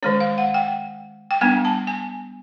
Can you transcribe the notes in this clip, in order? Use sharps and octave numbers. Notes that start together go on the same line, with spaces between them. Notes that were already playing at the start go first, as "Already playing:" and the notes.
D#3 G#3 C#4 C#5
F5
F#5
G5
G5
G3 B3 D4 G#5
A5
G#5